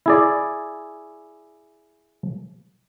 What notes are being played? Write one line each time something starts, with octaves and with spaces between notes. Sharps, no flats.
E4 G#4 D5